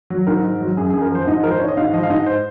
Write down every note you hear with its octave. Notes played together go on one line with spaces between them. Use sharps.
F#3
G#2 A#4
G#2
F#3
F#2 G#4
F#2 G#4
A#4
F3 C5
G#2 D#5
F3 A#4
C5
G#2 C#5
D#5
G#2 F5
F3 D#5
F5
G#2 D#5
C5